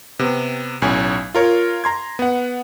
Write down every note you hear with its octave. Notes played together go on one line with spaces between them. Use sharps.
C3 B3
B1 A2 C#4 G#5
F4 A#4 C#5
A#5 C6 G#6
B3 F#5